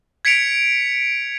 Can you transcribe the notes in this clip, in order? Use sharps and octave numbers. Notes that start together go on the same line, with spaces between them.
G#6 B6 C#7 D7 F7